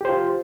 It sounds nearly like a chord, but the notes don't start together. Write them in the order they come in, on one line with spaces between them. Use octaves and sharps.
G4 C5 F4